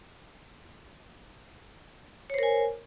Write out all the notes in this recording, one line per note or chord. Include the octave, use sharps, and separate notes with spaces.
A#4 C5 C#5 G#5